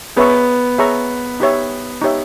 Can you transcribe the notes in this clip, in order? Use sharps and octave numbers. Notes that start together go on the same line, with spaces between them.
B3 G#4 C#5 E5 A#5 C#6
G#4 C#5 E5 A#5 C#6
D#4 G4 C#5 E5
D#4 G4 C#5 E5